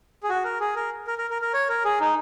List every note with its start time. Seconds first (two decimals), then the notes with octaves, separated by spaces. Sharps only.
0.23 G#4
0.29 F#4
0.44 A#4
0.61 G#4
0.76 A#4
1.07 A#4
1.18 A#4
1.30 A#4
1.42 A#4
1.54 C#5
1.69 A#4
1.85 G#4
2.00 D#4